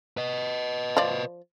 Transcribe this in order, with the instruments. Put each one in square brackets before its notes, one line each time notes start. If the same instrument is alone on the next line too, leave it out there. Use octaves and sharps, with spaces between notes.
[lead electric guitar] B4 D#5
[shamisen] F3 D5